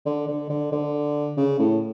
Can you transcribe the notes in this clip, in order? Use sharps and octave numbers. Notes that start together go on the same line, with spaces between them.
D3
D3
D3
D3
C#3
A2